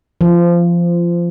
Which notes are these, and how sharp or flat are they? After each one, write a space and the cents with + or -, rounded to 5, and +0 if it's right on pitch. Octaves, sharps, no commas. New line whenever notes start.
F3 -20